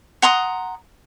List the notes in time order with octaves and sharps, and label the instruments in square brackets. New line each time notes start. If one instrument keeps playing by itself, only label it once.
[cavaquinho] F#5 A#5 C6 D#6